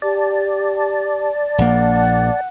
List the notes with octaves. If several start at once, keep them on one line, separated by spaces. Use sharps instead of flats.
G4 D5 A5
A#1 A#3 F#5